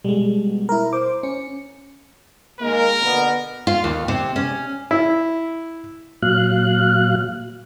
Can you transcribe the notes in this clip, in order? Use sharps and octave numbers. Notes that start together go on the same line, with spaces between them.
B2 G3 G#3
E4 A#4
C5 D6
C#4 C#7
D#3 G#3 A#3 A#4
B2 D3 B3
F4
D#2
C3
C#4
E4
A#2 F#3 F5 F#6